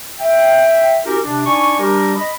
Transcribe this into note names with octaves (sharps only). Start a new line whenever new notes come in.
E5 G5
C#4 E4 F#4 G4 A#4
C3 D4
D4 D#4 D5 G#5 C#6
G3 D4 G4 A#4
D#5 B5